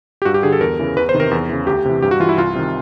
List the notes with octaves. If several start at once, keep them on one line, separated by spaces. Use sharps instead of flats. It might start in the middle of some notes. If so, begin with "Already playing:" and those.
G4
G2 F#4
G4
D3 G#4
A4
E2 A#4
C#3 E3
E2 B4
C5
C3 D#3
A#4
E2
C#3 E3
D2 G4
C3 E3
G2 G4
F#4
E3 F4
E4
C2 F4
C3 D#3